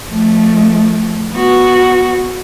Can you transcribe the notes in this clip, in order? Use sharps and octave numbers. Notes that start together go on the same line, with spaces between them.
F3 A3
B3 F#4